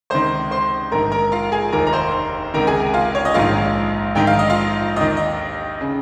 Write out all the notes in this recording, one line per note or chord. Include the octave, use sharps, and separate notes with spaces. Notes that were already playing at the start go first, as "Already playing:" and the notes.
C#2 C3 D#3 C5 C6
C5 C6
A#1 G#2 D#3 A#4 A#5
A#4 A#5
F4 F5
G#4 G#5
F1 D#2 D#3 A#4 A#5
A#5
C5 C6
C#2 C3 D#3 A#4 A#5
G#4 G#5
F4 F5
C#5
D#5
A#1 G#2 D#3 F4 F5
A#1 G#2 D#3 G5
F5
D#5
F4 F5
D#2 D#3 D#5
D#5
C#3